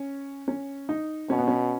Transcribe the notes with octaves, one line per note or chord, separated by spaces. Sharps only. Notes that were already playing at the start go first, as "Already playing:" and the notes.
Already playing: C#4
C#4
D#4
B2 C#4
B3
C#4